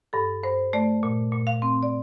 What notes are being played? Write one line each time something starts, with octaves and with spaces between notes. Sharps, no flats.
G2 A4
G2 C5
A3 D5
A#2
A#2
F5
C4
D5